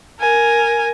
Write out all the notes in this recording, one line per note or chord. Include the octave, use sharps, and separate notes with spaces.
A#4 G#5